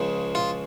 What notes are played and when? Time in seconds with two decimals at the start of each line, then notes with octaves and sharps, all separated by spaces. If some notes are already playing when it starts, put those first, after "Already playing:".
Already playing: C#2 C#3 F3
0.35 F4